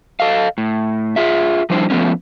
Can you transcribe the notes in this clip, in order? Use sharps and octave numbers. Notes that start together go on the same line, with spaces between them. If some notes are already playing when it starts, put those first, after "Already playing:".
A4 D#5 F5
A2
F4 G#4 E5
F3 G3 D4 E4 C5
F3 F#3 A3 B3 C#4